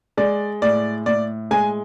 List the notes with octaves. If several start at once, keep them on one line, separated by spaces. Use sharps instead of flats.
G#3 D5
A2 D5
A2 D5
G#3 G#5